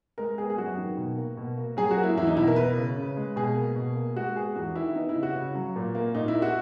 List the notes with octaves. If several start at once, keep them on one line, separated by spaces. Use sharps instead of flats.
G#3 A#4
B3 G#4
G#4
F#2 F#4
D#3
B2
A#3
B2
A#3
F#3 G#4
F#4
A#3
E4
E2 E4
D#4
B2 E4
A#4
B3 B4
C#3
C#3
G#3
B2 G#4
A#3
B2
A#3
G#3 F#4
B3 G#4
E2 F#4
D#3 E4
B3 D#4
E4
C#3
F#4
C#3
F#3
A#2
A#3
A#2 D#4
E4
A#3
F#4